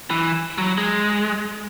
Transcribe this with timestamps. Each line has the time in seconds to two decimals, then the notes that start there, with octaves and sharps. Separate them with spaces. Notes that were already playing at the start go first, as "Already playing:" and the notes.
0.10 E3
0.58 F#3
0.78 G#3